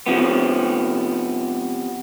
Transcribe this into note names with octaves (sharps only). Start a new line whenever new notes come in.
C3 F3 B3